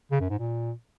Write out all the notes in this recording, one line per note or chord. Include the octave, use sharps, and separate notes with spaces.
C#3
F#2
G#2
A#2